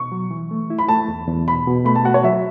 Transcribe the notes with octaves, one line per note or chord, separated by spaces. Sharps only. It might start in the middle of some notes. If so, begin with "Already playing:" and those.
Already playing: B2 C#6
F#3
E3
A3
E4
B5
A3 A5
E2
E2
B2 B5
B2
A3 B5
A5
F#4 F#5
C#5
F#3 E5